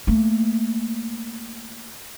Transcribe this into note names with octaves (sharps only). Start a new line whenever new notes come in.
A3 A#3